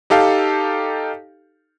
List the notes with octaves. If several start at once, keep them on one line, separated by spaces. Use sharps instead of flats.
D#4 G4 A4 F5